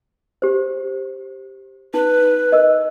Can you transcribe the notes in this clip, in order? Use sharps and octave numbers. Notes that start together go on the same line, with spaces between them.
G4 C5
D#4 B4
A#4 D#5